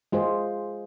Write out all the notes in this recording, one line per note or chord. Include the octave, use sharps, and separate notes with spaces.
G#3 F4 G#4 C5